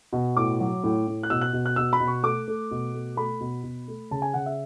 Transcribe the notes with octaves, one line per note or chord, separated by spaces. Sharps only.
B2
A2 D6
F#3
A2
A2
F#6
B2 E6
F#6
B2
F#6
B2 E6
B5
B2
C#6
A3 D6
A3
B2
A3
A3 B5
B2
B2
A3
C#3 A5
G#5
C#3 F#5
E5